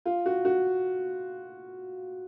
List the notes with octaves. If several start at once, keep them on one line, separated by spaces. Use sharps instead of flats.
F4
F#4
F#4